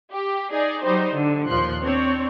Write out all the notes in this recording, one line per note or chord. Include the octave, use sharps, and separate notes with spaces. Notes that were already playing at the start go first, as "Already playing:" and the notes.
G4
D#4 G#4 D5
F#3 G3 D#4 C5
D3
D#2 A#2 F3 C6 F#6
C4 D4 C#5